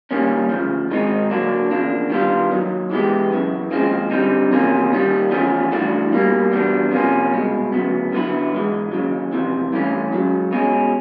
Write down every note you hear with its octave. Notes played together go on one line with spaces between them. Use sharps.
G2 D#3 G3 A#3 C#4
D2 C#3 F3
G#2 D#3 G#3 C4 D#4
D3 F#3 A#3 D4 F#4
E2 C#3 F3 A#3 D4
D#3 G3 B3 D4 F4
D#2 D#3 F#3
E3 G#3 B3 E4 G4
F#2 C#3 E3
D#2 C#3 F3 G#3 C4
D3 G3 C4 D#4
E2 C3 F3 A#3 C#4
D#2 D#3 G3
E2 C#3 F3 A3 C#4
G2 E3 A3 D4 F#4
B2 G3 A#3
E2 B2 G3 B3 D4
C3 F3 A#3 C#4
C2 B2 G#3
D2 C#3 F#3 B3
F#2 D3 F#3 B3 E4
G#2 E3 G#3
D#2 C#3 F#3
F2 C3 E3
G2 E3 A3 C#4
C#2 C#3 F#3
B2 G#3 C#4